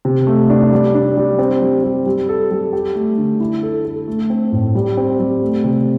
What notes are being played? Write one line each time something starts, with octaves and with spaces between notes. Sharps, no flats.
C3
A3
D4
G3
D4
G3
C4
G3
G3
G3
A4
G3
G4
A3
D3
E4
A4
A4
A3
C4
A2
G3
C4
G3
A3
C3